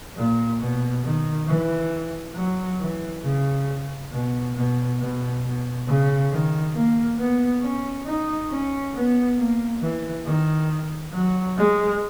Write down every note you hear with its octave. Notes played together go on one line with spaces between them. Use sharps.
A#2
B2
D#3
E3
F#3
E3
C#3
B2
B2
B2
B2
C#3
D#3
A#3
B3
C#4
D#4
C#4
B3
A#3
E3
D#3
F#3
G#3